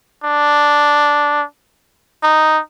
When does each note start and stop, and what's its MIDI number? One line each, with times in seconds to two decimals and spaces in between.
0.24 1.44 62
2.23 2.60 63